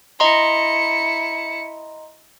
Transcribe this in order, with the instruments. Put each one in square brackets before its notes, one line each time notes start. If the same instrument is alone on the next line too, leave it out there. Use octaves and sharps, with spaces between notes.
[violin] E4 C#7 [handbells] D#5 A#5 C6